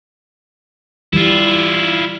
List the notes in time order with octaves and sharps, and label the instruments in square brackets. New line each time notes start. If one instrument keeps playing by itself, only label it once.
[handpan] E3 G3 [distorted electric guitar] E4 F4